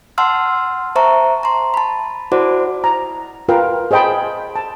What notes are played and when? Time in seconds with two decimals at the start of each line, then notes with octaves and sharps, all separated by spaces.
0.18 F#5 A5 C6 E6 F6
0.96 C5 E5 A5 A#5 C#6
1.43 A#5 C6
1.74 A5 B5
2.32 E4 F#4 C5 D5 F#5 D6
2.84 A#5
3.49 F4 A#4 B4 F5 G5
3.91 G#4 C5 D#5 G5 A5 B5
4.56 A5